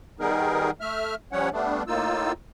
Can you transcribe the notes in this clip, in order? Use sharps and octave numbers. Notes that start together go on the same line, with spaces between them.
D#3 G3 B3 D#4 G#4 A#4
A3 E5 F6
F3 G3 C#4 C#5 F#5
G3 A3 B3 D4
A2 A#3 D#4 F4 E6